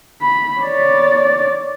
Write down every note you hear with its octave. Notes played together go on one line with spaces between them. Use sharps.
B5
C#5 D5